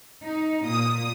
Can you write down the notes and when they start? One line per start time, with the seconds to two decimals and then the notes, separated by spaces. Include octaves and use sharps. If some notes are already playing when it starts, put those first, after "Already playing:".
0.23 D#4
0.66 A#2 D#6